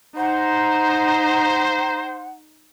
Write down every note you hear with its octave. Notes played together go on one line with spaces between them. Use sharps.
D#4 C5 F#5 A#5